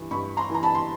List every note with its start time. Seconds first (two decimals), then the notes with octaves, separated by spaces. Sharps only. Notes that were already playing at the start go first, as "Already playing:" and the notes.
Already playing: G2 E3
0.11 G2 B5 C#6
0.37 A#5 C6
0.50 E3 A#5
0.63 A5 B5
0.75 C6